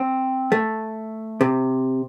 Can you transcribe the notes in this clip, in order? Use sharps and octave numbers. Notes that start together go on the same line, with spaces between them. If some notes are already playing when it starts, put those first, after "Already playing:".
Already playing: C4
A3
C3